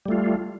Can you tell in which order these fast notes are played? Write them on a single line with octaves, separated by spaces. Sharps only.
G3 A3 F4